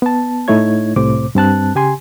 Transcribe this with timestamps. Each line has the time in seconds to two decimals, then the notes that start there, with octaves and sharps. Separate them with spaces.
0.02 B3 A5
0.48 A2 A3 D#4 E4 C#5 G#6
0.96 C2 A2 C3 C5 D6
1.35 G2 C4 A5 F#6
1.75 C#3 G4 G#5 C6